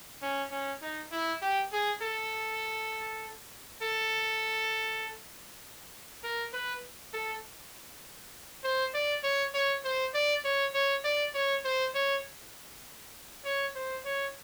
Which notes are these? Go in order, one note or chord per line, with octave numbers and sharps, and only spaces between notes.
C#4
C#4
D#4
E4
G4
G#4
A4
A4
A#4
B4
A4
C5
D5
C#5
C#5
C5
D5
C#5
C#5
D5
C#5
C5
C#5
C#5
C5
C#5